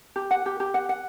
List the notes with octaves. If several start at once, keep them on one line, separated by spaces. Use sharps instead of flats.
G4
F#5
G4
G4
F#5
F#5